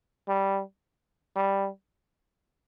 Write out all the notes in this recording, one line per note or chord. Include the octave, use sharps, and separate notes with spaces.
G3
G3